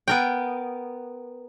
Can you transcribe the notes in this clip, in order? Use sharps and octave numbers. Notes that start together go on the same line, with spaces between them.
B3 A#4 G5